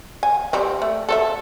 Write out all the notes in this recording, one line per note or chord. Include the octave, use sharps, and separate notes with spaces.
G#5
G3 C4
A3
A4 C5 E5